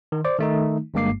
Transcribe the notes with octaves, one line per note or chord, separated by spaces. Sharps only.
D#3
C5 D5 D6
D#3 A3 D#4
G1 G2 G#3 A#3 D6 C7